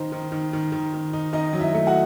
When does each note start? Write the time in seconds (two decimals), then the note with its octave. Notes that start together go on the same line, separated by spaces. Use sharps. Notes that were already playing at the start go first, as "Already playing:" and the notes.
Already playing: D#3 D#4 C5
0.12 D#3
0.32 D#3
0.53 D#3
0.72 D#3
0.93 D#3
1.13 D#4
1.33 D#3 D#4 D#5
1.53 F#3
1.60 E4 E5
1.74 A3
1.87 F#4 F#5